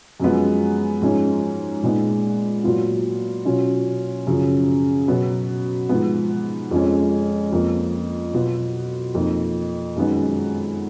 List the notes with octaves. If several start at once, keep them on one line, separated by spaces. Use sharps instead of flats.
F#2 F3 G#3 B3
G#2 F3 G#3 C#4
A#2 G#3 B3 D#4
A#2 F#3 B3 F4
B2 F#3 C#4 F4
F#2 C#3 F3
B2 F#3 B3
G#2 F3 B3
F2 F3 G#3 C#4
F2 F3 A#3
B2 F#3 B3 F4
F2 F3 A#3 D#4
F#2 D#3 G#3 B3